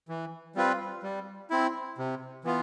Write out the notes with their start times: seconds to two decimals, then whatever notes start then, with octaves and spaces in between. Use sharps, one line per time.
0.09 E3
0.56 G3 C4 F4 B4
1.03 G3
1.50 C4 E4
1.98 C3
2.44 E3 B3 F4